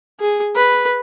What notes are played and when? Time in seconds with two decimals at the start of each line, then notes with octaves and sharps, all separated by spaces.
0.20 G#4
0.56 B4